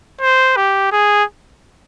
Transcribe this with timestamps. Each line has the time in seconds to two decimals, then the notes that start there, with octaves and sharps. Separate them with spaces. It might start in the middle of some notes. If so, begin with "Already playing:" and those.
0.21 C5
0.56 G4
0.92 G#4